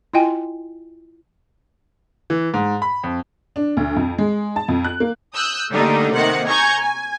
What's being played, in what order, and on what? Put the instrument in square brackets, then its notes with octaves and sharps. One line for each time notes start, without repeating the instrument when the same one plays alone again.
[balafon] E4 F4 D#5 G5 G#5
[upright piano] E3
G#2
B5
F2
[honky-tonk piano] D4
D2
F2
G#3
A5
F2
F#6
A#3
[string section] D#6 E6 F#6 G6
D3 G3 A3 A#3 D4 D#4
C3 D#3 A#3 C4 F#5
G#5 A#5 C#6 G6 G#6
G#5